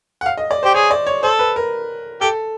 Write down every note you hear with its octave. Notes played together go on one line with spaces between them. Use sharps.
F#5
F5
D#5
D5
G4 C5
G#4 C#5
D5
C#5
A4 C5
B4
A#4
G4 A4